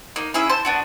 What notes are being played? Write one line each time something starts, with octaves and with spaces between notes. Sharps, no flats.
A#3 D#4
C#4 E4 G#4 E5
C5 A5
B3 D4 F#4